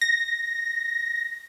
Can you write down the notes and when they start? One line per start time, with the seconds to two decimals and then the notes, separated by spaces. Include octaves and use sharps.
0.01 A#6